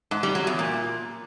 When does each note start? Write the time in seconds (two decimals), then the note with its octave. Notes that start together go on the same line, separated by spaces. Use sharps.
0.11 G#2
0.23 G3
0.35 F#3
0.47 E2
0.59 A#2